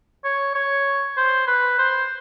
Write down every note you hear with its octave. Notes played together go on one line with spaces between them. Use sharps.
C#5
C#5
C5
B4
C5